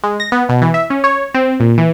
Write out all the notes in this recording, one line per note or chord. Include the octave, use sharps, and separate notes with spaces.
G#3
A#6
B3
B2
E3
E5
C#4
C#5
C4
A#2
E3